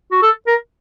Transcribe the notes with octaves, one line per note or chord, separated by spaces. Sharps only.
F#4
A4
A#4